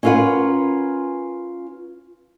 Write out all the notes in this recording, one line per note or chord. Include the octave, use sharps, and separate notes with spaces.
C#4 E4 F4 A#4 B4 F#5